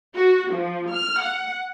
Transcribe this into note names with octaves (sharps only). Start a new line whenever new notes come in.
F#4
F3
F6
F#5